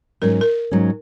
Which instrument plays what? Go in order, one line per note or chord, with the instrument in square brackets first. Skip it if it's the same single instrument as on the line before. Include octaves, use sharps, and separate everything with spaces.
[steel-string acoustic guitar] G#2 F#3 C#4 [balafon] A#4
[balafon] A#4
[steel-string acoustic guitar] G#2 F#3 C#4